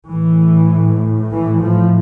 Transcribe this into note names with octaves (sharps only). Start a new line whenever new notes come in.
A2 E3
E3
F3